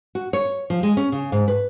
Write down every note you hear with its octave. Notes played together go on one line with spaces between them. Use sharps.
F#4
C#5
F3
G#3
C#4
C#3
G#2
B4